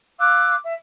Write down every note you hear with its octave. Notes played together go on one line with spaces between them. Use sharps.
F5 D6 E6 F#6
E5